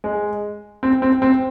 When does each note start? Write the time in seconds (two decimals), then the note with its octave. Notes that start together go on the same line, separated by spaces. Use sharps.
0.04 G#3
0.83 C4
1.02 C4
1.22 C4